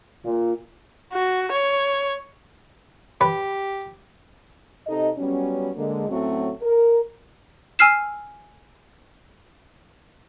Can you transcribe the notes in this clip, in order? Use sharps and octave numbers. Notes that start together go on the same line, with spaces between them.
A#2
F#4
C#5
G4 B4
C3 D#4 A4 D#5
F#3 G3 B3 C#4
D3 G#3 A#3
A2 F#3 A3 C4 C#4 F#4
A#4
G#5 E6 F6 C7 E7